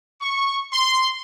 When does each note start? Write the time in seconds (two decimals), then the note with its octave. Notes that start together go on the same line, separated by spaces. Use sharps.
0.21 C#6
0.72 C6